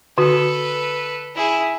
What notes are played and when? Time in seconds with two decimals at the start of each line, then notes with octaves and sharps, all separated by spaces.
0.18 D3 F#4 A4 B4
1.35 E4 G#4